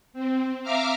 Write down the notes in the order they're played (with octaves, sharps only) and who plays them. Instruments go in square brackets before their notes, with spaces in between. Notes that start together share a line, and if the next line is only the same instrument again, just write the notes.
[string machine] C4
E5 F5 A#5 D6 F6